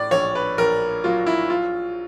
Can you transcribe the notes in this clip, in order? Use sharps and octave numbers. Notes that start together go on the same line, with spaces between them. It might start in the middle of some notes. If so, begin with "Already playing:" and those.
Already playing: A2 D5
A#1 C#5
B4
A#1 A#4
F#3 F4
E4
F4